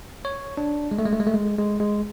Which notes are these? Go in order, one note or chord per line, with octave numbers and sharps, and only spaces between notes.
C#5
D4
G#3
A3
G#3
A3
G#3
A3
G#3
G#3
G#3